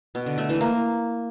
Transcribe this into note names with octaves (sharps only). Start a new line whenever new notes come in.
B2
D3
A3
E3
A#3